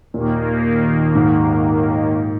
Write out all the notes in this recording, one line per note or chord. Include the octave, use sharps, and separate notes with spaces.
D#2 A#2 D#3 A#3
G#2